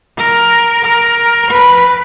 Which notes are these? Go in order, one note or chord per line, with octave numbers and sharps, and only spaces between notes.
A#4
A#4
B4